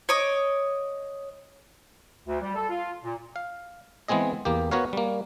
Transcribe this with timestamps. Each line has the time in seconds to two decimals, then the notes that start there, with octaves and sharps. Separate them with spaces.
0.09 C#5 D#5 D6
2.27 D2
2.41 G3
2.55 A4
2.70 F4
3.04 A#2
3.36 F5
4.08 E3 G#3 B3 C4 G#4 D#5
4.45 E2 A#3 G4
4.71 B3 F#4 A#4 B4 C#5 F5
4.93 G3 A#3